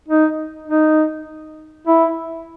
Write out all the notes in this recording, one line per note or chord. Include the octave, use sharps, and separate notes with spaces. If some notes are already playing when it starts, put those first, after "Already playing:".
D#4
D#4
E4